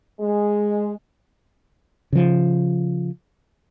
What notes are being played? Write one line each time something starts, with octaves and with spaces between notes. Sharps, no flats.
G#3
C#3 F3